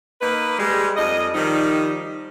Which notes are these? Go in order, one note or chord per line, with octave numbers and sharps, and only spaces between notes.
A#3 D#4 B4
G3 G#3
F2 D5 D#5
D#3 F3 G3 D#4